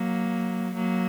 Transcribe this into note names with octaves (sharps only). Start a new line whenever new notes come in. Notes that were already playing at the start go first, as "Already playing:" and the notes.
Already playing: F#3 A#3
F#3 A#3